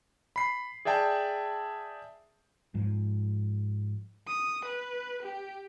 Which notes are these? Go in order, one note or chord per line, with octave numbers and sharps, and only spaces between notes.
B5 C7
G#4 D5 E5 G5 A5
G#2 F3
D#6
B4
G4